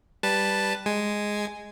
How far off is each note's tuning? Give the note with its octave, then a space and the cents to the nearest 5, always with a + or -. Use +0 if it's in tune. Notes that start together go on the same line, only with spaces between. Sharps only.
G3 +0 B4 +0 A5 +0
G#3 +0 G#5 +0